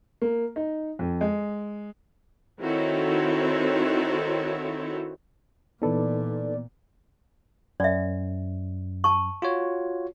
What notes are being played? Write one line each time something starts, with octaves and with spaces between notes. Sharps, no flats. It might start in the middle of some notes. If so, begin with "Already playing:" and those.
A#3
D#4
F2
G#3
D#3 C4 E4 F#4 A4 C#5
A#2 E3 B3 D#4 A4 B4 D5
F#2 D5 E5
A5 C#6
F4 F#4 C#5